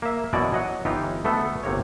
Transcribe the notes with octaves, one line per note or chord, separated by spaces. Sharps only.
A#3 E5
F#2 B2 E3 F#4 D5 G#5
F#3 D#5 F#5
G1 E3 D#4 F4 G4
D2 A3 B3 A4
G1 C3 A#3 C#5